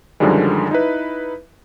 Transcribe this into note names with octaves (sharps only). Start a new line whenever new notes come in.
F#2 D3 D#3 F3 G3 G#3
D#4 E4 B4